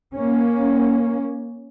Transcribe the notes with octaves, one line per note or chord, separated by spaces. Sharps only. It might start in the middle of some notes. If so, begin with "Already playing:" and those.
A#3 C#4